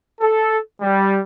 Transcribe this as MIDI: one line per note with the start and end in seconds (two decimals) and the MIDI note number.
0.21 0.59 69
0.82 1.18 55